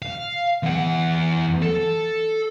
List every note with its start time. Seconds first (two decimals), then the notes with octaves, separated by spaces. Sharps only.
0.02 F5
0.63 E2 F#5
1.62 A4